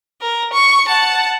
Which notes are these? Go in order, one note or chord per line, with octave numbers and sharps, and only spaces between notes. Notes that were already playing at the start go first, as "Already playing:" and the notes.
A#4
C#6
F#5 A5